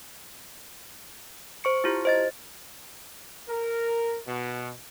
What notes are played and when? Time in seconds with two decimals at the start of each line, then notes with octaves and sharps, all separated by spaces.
1.64 C5 C#6 C#7
1.84 E4 F4 G4
2.05 C5 D#5 A6
3.48 A#4
4.27 B2